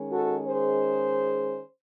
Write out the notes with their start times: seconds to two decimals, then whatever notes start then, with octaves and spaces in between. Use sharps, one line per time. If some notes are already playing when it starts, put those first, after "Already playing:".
Already playing: D#3 G#3 C#4
0.12 F#4 A4
0.45 G#4 C5